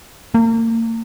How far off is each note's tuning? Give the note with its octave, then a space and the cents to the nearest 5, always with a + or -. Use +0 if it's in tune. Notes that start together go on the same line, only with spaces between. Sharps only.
A#3 -40